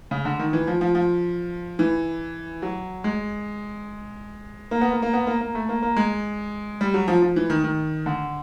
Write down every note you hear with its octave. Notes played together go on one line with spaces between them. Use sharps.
C#3
D3
D#3
E3
F3
F3
F3
E3
F#3
G#3
A#3
B3
A#3
A#3
B3
A#3
A#3
A3
A#3
A#3
G#3
G3
F#3
F3
F3
E3
D#3
D#3
D3